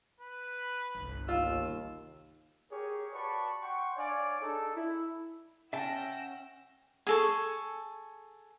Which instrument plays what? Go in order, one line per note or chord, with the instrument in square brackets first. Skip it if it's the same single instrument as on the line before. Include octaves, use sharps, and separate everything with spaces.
[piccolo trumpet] B4
[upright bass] G1 C2
[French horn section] D#2 [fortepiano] F4 [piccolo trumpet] E6
[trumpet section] G4 G#4 A#4 C#5
F#4 B4 D5 A5 B5 C#6
F#5 G5 C6 C#6
D4 C#5 D5 F5 G#5
D4 D#4 G#4 A4
E4
[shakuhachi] C#4 [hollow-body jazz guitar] E5 A5 [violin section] F#5 E6 A#6 [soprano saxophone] G5
[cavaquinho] G#4 A4 C#6